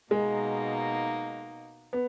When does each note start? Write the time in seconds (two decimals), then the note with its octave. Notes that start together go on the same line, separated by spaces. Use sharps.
0.11 B2 G#3 A#3 D#4
1.93 B3